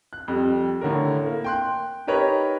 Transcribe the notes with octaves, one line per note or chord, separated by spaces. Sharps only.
F#6
F2 G3
A2 D3 C#4 A#4
A#3
G5 C6 F#6
D#4 G4 A#4 B4 C#5